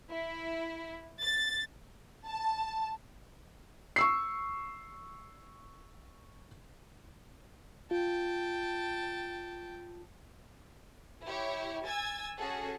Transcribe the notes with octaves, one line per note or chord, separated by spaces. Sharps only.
E4
A6
A5
C#6 E6 C7
F4 G5 A5
E4 G4 C#5
G#5 E6 G#6 A6
C#4 F#4 G#4 A4